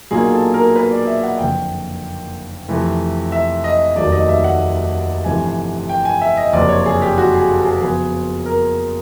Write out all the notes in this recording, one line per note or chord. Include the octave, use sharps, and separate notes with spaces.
B1 A#2 F#3 A#3 G#4
A4
A#4
B4
D5
E5
F#5
F#1 F2 D3 G5
F2 C3 E3 A3
E5
D#5
F1 D#2 D#3 F#3 A3 D5
D#5
E5
F#5
G1 F2 C3 E3 A3 G#5
G5
G#5
E5
D#5
F#1 F2 C3 D5
C#5
G#4
G4
F#4
G#4
A4
G#4
F2 C#3 F#3 B3 G#4
A#4